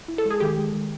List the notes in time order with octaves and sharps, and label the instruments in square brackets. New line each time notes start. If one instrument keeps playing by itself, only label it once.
[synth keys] E4
[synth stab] A4
[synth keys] G#3
[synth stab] G#4
[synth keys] D#3 [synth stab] G4
[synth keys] G#3
D#3